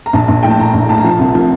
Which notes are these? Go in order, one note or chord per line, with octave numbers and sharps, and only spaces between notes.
A#5
A#1 A5
A#1
A2 G5
A5
A2 A#5
A#1
A2 A5
A#5
F3 A5
C2
F3